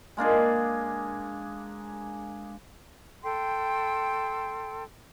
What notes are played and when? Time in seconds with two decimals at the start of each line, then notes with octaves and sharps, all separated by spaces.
0.17 G#3 A#3 D4 G#4
3.23 A4 G5 C6